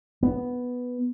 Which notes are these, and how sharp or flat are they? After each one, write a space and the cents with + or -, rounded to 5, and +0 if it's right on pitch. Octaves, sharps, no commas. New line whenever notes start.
B3 +0